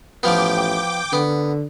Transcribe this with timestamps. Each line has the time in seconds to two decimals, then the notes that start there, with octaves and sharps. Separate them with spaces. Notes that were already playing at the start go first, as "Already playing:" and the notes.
0.23 A1 F3 B3 G5 D6
1.13 D3 B3